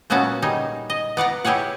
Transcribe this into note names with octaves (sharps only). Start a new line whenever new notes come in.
A#2 F#3 B3 C#4 F#4 A5
G3 D#4 G#4
D#5
B3 D5 F#5 A#5
E4 G4 G#4 C#5 F#5